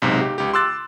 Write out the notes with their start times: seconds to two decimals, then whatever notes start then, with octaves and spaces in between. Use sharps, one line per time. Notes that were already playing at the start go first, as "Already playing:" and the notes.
0.02 B1 G#2 C3
0.21 G4
0.38 C#2 G4
0.53 C6 D6 E6 F#6 A6